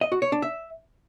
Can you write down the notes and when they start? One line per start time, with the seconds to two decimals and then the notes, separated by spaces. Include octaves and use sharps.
0.01 D#5
0.12 F#4
0.22 C#5
0.32 D4
0.42 E5